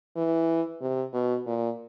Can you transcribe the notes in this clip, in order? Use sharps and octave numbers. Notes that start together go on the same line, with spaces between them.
E3
C3
B2
A#2